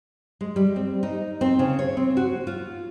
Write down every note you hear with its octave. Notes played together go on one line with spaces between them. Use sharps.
G#3
G3
C4
D#4
C4
C#3
C#5
C4
F#4
F4